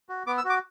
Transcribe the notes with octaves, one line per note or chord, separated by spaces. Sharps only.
F#4
B3 D6
E6
F#4 D6